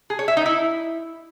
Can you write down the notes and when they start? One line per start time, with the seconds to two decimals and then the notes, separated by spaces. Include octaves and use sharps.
0.10 G#4
0.19 C#5
0.28 E5
0.37 D#4
0.46 E4